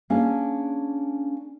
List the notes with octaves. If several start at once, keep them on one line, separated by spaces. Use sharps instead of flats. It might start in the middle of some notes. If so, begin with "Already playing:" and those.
A#3 C#4 D4 G#4